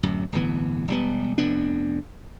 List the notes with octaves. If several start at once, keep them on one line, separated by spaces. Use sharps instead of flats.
D1 F#2
D1 G1 E3 B3
E1 G3 B3
F1 F2 B3 D4